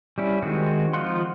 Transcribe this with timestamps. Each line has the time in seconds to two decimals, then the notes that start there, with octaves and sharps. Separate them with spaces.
0.18 G3 C#4 E4
0.42 D#3 G#3 C4 F#4
0.93 F3 D#4 F4 F#5 C6